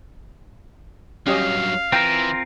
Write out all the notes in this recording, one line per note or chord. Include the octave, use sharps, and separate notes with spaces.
G2 F#3 C#4 G4 D#5 F5
E3 C4 F4 A#4 G5 A#5